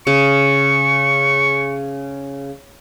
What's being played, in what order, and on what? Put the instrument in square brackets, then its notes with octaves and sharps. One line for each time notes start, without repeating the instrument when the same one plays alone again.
[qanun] C#3 [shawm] C#6